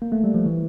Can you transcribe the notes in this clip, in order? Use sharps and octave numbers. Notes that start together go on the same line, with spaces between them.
A#3
A3
G3
F3
E3